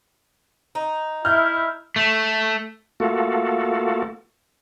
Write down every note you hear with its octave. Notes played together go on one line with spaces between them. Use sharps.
D#4
E4 F6 G6
A3
A3 A#3 F4 F#4 A4